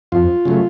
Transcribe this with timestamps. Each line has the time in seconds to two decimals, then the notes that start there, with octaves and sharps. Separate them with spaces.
0.12 F2 F4
0.45 C#3 F#3 A3